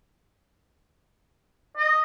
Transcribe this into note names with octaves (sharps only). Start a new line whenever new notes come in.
D#5